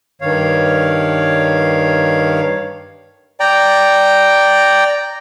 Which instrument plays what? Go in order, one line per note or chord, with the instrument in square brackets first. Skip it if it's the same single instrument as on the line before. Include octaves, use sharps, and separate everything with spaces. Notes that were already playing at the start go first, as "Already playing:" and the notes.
[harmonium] G2 D#3 C#5 F5
[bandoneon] D5 G5 A#5